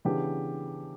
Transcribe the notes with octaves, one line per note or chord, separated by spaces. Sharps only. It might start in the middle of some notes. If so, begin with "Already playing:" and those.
C#3 E3 B3 D4 G4